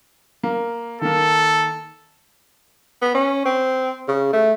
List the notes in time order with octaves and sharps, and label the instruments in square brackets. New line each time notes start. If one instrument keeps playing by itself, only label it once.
[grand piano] A#3
[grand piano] D#3 A#3 [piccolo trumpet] A4
[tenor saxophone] B3
C#4
C4
C#3
A3